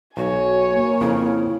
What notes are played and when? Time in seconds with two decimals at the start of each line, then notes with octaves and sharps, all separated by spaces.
0.17 B1 F#4 C#5 G#5
0.72 A#3
1.01 F2 C#3 E4 F5